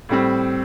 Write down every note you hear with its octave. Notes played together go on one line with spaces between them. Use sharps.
A2 G3 C4